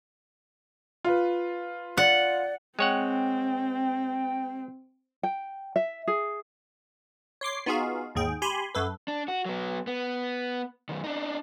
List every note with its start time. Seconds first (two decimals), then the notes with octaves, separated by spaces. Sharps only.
1.05 F4 B4
1.97 D5 F#5
2.79 G#3 C4 C#5 F#5 G5
5.23 G5
5.76 E5
6.08 G#4
7.41 C#5 C6 D6 C7
7.66 B3 D#4 F4 F#4 G#4 F5
8.15 D#2 G#2 G#4 G5
8.42 G4 G#5 B5 C6
8.75 F#2 A4 B4
9.08 D4
9.28 F#4
9.45 F#3 B3
9.87 B3
10.89 F#2 D#3
11.04 D4 D#4